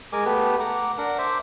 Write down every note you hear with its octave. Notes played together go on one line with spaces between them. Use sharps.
G#3 A#4 G#5 D6
A3 B3 G4 B4
F#5 A#5 D6
D4 A#4 F#5
C5 E5 D6